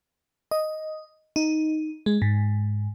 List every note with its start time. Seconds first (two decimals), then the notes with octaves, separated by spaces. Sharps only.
0.51 D#5
1.36 D#4
2.06 G#3
2.22 G#2